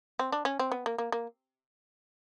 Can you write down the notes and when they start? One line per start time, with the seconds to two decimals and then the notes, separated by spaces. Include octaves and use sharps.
0.19 C4
0.32 D4
0.45 C#4
0.59 C4
0.72 B3
0.86 A#3
0.98 A#3
1.12 A#3